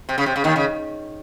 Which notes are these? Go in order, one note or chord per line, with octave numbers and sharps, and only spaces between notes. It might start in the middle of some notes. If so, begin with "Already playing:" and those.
C3
C#3
C3
C#3
D#2 D#3
C#3